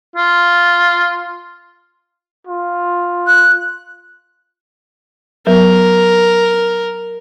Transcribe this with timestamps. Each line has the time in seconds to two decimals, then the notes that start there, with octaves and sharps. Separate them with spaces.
0.16 F4
2.47 F4
3.27 F#6
5.47 F#3 B3 A#4